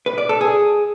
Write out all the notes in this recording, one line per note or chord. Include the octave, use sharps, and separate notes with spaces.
B4
D5
A4
G#4